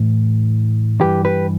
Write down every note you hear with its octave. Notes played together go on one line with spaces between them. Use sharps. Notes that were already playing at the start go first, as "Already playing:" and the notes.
Already playing: A2 E3
G2 E3 G4 B4
G4 B4